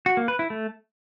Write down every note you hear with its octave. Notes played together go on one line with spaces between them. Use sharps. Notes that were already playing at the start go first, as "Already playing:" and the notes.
F#4
A#3
B4
E4
A3